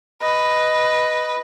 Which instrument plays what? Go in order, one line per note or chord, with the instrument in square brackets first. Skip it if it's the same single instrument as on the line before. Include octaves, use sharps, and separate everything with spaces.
[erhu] B4 [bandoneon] D#5